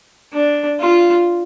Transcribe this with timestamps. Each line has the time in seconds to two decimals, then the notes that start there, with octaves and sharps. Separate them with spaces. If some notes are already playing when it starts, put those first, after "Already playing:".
0.33 D4
0.80 F4